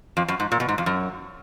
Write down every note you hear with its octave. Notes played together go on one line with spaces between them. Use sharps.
F2
F#2
G#2
A#2
B2
G#2
F2
F#2